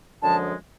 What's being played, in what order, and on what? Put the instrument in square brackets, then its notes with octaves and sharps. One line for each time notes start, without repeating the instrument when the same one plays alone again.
[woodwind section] F#2 D3 F3 G#3 A5